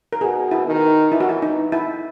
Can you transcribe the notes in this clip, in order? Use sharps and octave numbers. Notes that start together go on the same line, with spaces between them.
A#4
B2 G#4
E4
D#3
E3 E4
F#4
E4
D#4
E4